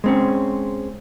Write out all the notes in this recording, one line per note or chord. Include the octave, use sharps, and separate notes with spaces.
G#3 C4 C#4